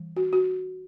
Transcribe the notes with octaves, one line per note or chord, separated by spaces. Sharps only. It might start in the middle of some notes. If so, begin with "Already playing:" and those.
Already playing: E3 G3
F#4
F#4